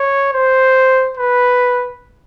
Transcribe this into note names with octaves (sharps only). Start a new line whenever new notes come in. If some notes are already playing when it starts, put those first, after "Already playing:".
Already playing: C#5
C5
B4